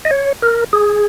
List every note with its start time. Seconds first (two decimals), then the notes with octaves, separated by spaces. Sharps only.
0.05 D#5
0.11 C#5
0.42 A#4
0.73 G#4